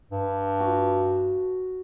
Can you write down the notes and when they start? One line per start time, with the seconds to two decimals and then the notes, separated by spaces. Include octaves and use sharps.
0.11 G2
0.60 F#4